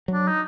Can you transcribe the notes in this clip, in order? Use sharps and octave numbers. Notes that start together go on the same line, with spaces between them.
F#3 D4
D#4